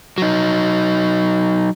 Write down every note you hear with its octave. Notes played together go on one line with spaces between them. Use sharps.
F#3 D#4